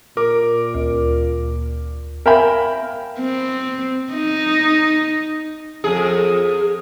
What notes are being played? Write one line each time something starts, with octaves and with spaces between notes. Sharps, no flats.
A#2 A#4 D6
D2
A#4 E5 F5 G5 G#5 B5
C4
D#4
F2 G#4